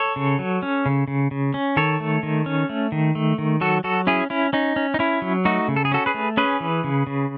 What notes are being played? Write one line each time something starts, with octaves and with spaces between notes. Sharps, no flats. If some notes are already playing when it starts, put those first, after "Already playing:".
Already playing: A4 C#5
C#3
F#3
C#4
C#3
C#3
C#3
C#4
D#3 A4 C#5
A3
D#3
C#4
A3
D#3
A3
D#3
F#3 F#4 A4
F#3 F#4 A4
C#4 E4 G#4
C#4 E4
C#4 D#4
C#4
D#4
C#4 E4
F#3
A3 D#4 F#4
C#3
A4
G#4
C#4 F#4 A4
G#4 B4
A3
C#4 G#4 B4
E3
C#3
C#3